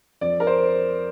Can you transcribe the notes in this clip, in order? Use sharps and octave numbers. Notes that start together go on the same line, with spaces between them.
F2 D5
A#4
C5